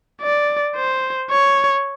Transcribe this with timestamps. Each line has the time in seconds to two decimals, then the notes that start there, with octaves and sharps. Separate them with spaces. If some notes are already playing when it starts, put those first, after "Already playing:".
0.22 D5
0.76 C5
1.31 C#5